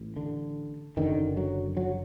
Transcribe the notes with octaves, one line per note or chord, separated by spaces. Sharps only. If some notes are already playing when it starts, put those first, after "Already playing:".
Already playing: A1 A2
D3
F#1 F#2 D3 D#3
F#3
F#3